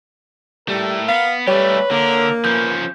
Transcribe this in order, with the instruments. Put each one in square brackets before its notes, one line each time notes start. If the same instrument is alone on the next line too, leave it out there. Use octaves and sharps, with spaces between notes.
[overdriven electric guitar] A2 A3 [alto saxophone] G3 [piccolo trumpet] A#4
[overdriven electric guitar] B3 [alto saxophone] F5
[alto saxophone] G3 [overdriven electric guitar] A3 G4 [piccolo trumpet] B4 [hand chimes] C#5
[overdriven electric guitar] D3 [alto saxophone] A#3 [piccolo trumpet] A#4
[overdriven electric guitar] F3 C#4 [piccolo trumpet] B4 [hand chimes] G6